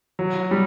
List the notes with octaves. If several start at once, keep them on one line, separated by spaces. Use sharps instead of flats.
F#3
G3